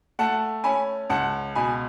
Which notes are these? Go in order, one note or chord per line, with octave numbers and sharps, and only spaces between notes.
A3 F#5 A5
C#4 G#5 B5
C#2 F#5 A5
B2 G#5 B5